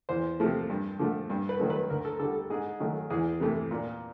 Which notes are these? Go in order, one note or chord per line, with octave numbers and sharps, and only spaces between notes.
E2 C5
C3 F3 A3
G2
D3 F3 A3
G2
B4
D#3 F#3 A3
B4
D2 A#4
A4
D3 G3 A4
A4
G#2 G#4
D#3 F#3 A3
E2 G#4
C3 E3 A3
A#2